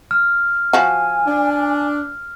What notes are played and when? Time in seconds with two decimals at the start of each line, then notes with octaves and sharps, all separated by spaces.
0.11 F6
0.73 F3 F#4 G#5
1.26 D4